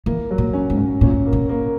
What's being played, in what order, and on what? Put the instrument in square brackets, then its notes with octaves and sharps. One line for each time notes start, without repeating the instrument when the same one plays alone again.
[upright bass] E3 [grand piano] A#3
[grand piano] F#3
[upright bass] A#2
[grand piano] C#4
[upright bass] G#2
[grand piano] C#4
[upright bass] A#2 [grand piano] C#4
[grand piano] A#3
[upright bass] B2
[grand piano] A#3